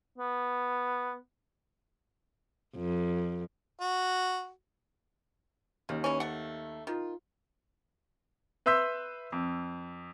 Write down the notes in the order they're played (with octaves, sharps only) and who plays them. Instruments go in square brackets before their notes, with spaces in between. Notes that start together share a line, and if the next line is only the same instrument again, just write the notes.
[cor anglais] B3
[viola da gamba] F2
[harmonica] F#4
[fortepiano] D#2 [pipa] C#3
[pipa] E3 C#4
A3 F#5
[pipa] D#3 [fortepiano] F4
[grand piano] B4 E5 C6 E6 G6 B6
F2